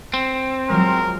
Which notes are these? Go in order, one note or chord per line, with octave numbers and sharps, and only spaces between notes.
C4
F3 F#3 G#3 A#4